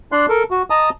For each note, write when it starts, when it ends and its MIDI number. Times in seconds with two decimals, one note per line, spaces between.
0.12 0.26 62
0.12 0.26 74
0.12 0.26 84
0.12 0.26 90
0.29 0.43 69
0.29 0.43 70
0.51 0.63 66
0.70 0.90 75
0.70 0.90 81
0.70 0.90 82
0.70 0.90 87